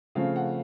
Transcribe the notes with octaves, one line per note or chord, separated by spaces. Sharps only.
C#3 F3 A3 C4 F5
F#5